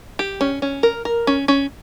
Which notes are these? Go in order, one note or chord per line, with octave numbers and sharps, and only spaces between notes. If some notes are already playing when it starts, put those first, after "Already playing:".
G4
C#4
C#4
A#4
A#4
C#4
C#4